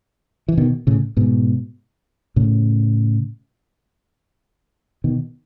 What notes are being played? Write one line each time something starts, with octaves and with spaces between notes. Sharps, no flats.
E3
B2 D#3
A2 C#3
G#2 B2
A2 C#3
B2 D#3